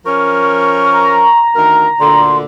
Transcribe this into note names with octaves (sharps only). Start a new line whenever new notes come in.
F3 C#4 A#4 C#6
A#5
D2 D#3 A#4
D2 A#2 D3 C6